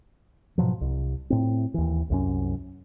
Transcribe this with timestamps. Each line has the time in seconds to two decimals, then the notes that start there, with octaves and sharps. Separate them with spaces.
0.58 G#2 B2 F3 F#3
0.81 C2
1.30 A2 C4
1.74 D#2 E3
2.10 C2 F#2 C#4